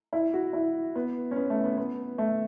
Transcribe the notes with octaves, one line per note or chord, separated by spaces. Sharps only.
E4
F#4
E4
B3
C#4
B3
A3
B3
B3
A3